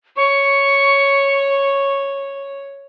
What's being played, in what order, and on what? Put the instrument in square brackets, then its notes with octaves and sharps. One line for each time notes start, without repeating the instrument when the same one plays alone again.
[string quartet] C#5 [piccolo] C#6